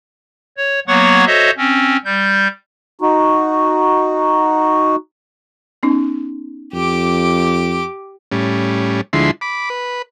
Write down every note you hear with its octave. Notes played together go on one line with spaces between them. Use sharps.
C#5
F#3 A#3 B3 C#5 F#5 C#6
F#4 A4 C5 C#5 D#5 E5
C4 C#4
G3 G6
D#4 F#4
B3 C#4 D#4
F2 G4 D6
A2 G3 C#4
D2 D3 F3 G#3 E4 C6
B5 D6
B4